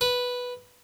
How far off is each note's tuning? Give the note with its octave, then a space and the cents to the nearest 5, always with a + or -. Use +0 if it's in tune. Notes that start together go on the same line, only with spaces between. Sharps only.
B4 -5